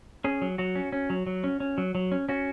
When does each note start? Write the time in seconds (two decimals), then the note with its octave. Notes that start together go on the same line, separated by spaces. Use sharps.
0.24 C#4 G#4
0.42 F#3
0.58 F#3 F#4
0.75 C#4
0.92 C#4
1.10 F#3
1.27 F#3
1.44 C#4
1.60 C#4
1.78 F#3
1.95 F#3
2.12 C#4
2.29 C#4 F#4